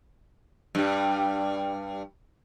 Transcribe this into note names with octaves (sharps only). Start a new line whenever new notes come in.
G2 G3